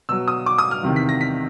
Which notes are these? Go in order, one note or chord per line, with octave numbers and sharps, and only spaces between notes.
B2 F#3 E6
D#6
D6
D#6
F6
E2 C3 D#3
B6
A#6
B6